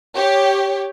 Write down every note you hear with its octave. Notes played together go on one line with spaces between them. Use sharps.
G4 C#5